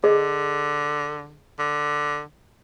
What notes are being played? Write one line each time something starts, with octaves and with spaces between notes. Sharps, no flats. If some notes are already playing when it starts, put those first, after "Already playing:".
D3 G#4 D#5
D3